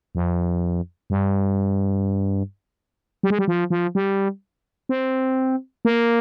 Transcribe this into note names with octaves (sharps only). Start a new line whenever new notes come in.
F2
G2
G3
G#3
G3
F3
F3
G3
C4
A#3